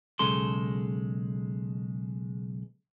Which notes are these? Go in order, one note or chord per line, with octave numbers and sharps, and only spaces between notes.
B1 C#3 G#3 A4 C6